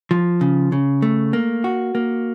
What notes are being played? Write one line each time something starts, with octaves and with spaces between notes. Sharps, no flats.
F3
C#3
C#3
A3
A#3
F#4
A#3